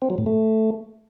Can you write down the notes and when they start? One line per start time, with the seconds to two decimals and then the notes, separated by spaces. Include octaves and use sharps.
0.02 C4
0.10 F#3
0.18 A2
0.26 A3